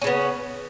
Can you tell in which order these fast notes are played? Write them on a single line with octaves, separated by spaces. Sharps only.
C#4 C#3 B3